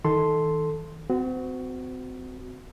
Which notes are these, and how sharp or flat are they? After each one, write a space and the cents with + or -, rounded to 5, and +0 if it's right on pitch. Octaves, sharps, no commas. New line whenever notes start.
D#3 +30 A4 +0 C6 +0
C4 -35 F#4 +0